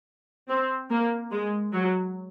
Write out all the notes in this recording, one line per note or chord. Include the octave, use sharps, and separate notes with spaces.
C4
A#3
G#3
F#3